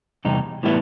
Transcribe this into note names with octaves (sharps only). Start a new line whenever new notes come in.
E2 C3 G3 D#4
A2 E3 G3 B3 E4